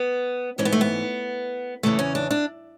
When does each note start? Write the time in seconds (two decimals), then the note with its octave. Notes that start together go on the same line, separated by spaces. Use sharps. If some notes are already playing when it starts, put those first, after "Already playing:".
Already playing: B3
0.58 G#2 E3 C#4
0.65 B3
0.73 A3
0.81 B3
1.83 E2 C#3 E3 A3
1.99 C#4
2.15 D4
2.30 D4